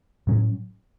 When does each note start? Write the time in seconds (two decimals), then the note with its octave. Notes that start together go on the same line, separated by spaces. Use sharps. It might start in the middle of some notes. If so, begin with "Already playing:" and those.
0.27 A2 F#3 C#4